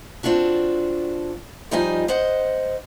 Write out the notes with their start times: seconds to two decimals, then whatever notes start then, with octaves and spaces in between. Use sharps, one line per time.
0.23 C4 D4 F4 F#4 A4
1.71 F3 G3 D#4 F4 D#5 G#5
2.08 C5 D#5 F#5